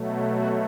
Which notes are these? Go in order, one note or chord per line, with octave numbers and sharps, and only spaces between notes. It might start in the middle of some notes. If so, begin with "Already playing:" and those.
Already playing: B2 F#3 A3
F#4